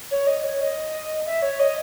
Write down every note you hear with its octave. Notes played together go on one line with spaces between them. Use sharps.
C#5
D#5
C#5
D#5
E5
C#5
D#5